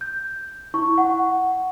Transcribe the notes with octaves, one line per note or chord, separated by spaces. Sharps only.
G6
E4 C#6
F#5